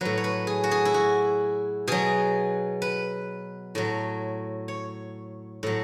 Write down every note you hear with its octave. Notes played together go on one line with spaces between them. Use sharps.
A2 F#3 B4
C#5
B4
G#4
F#4
G#4
E4
F#4
B2 F#3 G#4
B4
A2 F#3
C#5
A2 F#3